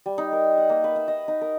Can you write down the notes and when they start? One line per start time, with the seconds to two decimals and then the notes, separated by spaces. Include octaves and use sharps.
0.06 G3
0.18 D#4
0.32 A#4
0.58 F#5
0.69 A#3
0.84 B4
0.96 E5
1.08 D#5
1.28 D#4
1.41 A#4